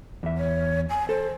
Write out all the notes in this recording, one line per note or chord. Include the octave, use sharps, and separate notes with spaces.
E2 E5
C#5
G#5
A4 C5